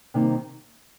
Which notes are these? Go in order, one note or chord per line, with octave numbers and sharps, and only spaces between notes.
C3 D#3 G3 A#3 D#4